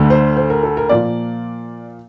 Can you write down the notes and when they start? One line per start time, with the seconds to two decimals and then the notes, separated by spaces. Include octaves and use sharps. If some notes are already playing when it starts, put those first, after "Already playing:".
Already playing: D2 D3 A3
0.10 C5
0.37 C5
0.50 A#4
0.63 A4
0.77 A#4
0.89 A#2 F3 A#3 D5